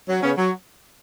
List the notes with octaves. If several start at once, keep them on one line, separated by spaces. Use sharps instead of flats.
F#3
C#3 B3 C#4
F#3